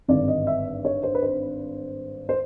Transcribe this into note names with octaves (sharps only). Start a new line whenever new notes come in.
G#1 G2 D3 D5
D#5
E5
C#5
C5
B4
C5
C5